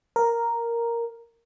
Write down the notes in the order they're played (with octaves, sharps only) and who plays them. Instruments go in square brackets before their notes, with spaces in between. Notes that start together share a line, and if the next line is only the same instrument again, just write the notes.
[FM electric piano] A#4